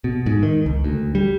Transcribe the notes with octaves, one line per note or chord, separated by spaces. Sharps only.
B2
G#2
D#3
C#2
D2
G3